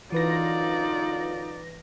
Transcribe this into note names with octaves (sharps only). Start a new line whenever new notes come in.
F#2 D3 E3 D#4 F4 B4 D5 A#6